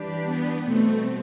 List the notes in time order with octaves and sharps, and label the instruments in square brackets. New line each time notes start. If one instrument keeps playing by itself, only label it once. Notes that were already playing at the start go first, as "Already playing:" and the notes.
Already playing: [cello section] E3 G3 D4 G4 B4
[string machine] B3
[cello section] B2 G3 C4 [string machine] A3